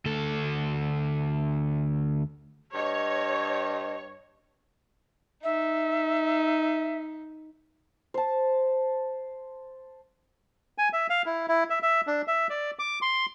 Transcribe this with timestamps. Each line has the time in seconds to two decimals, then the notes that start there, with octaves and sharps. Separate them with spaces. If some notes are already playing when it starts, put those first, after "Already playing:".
0.06 D2 A4
2.74 G2 C#5 D#5
5.44 D#4 E5
8.14 C5 A5
10.78 G#5
10.93 E5
11.10 F5
11.26 E4
11.48 E4
11.70 E5
11.83 E5
12.07 D4
12.28 E5
12.50 D5
12.79 D6
13.02 C6